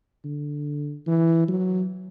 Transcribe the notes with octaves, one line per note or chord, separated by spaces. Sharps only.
D3
E3
F#3